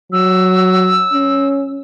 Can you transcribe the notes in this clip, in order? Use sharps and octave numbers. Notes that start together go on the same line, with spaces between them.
F#3 E6
C#4